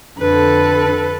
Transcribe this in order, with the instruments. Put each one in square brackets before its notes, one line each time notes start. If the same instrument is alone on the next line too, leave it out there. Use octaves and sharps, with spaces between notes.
[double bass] F2 D3 [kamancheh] A4 B4